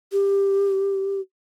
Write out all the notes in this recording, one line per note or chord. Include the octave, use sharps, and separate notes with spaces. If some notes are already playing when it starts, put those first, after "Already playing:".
G4